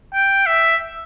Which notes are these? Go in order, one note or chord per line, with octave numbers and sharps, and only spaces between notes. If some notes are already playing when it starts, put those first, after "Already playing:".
G5
E5